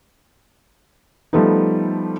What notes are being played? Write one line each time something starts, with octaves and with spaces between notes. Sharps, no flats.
F3 G3 A3 B3 D#4